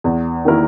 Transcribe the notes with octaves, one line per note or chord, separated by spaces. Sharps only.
E2
D#3 A#3 E4 A#4